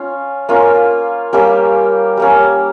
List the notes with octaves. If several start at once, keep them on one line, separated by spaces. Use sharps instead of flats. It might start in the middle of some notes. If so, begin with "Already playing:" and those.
Already playing: C#4 F4
A#3 C#4 F4
G3 A#3 C#4 G4
G3 A#3 C#4